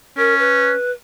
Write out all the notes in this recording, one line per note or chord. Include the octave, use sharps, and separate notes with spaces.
C#4 A#4
B4